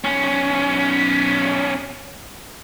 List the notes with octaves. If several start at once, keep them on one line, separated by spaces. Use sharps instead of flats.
B1 C#4